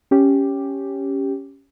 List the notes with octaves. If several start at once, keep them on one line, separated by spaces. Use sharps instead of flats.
C#4 G4